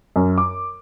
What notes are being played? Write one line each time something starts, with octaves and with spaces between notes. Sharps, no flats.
F#2
D6